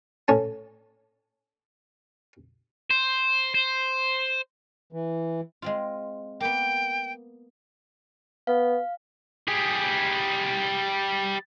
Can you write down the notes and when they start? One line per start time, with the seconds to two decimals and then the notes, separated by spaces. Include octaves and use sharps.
0.28 A2 C#4 C#5 A5
2.91 C5
3.54 C5
4.93 E3
5.62 G#3 C4 F4
6.40 A#3 B3 G5
8.47 B3 F5
9.48 G3 G#4